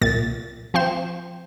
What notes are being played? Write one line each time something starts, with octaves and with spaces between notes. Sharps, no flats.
C2 A#2 A6
F3 C4 G5 C6 E7